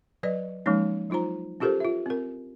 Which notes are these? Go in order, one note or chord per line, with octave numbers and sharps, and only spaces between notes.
F#3 B4 D5 D#5
F3 G#3 A#3 C#4 D#4
F#3 D#4 F4 C5 A#5
C#4 F4 G4 A4 A#4 C5
F4 E5
C4 A#4